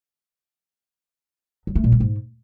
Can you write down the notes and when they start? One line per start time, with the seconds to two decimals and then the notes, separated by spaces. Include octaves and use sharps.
1.67 F#3
1.75 A3
1.84 A#2
1.92 G#3
2.00 G#2